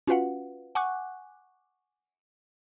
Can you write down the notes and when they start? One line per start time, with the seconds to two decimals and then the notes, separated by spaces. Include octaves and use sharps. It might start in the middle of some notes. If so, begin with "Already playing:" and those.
0.07 C#4 F4 F#4 B4 F5 F#5
0.75 F#5 G#5 C#6 D6 F#6